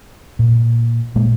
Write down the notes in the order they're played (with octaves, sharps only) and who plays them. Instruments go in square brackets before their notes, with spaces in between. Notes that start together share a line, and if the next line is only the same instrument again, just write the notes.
[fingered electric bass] A#2
A#2 G#3 A#3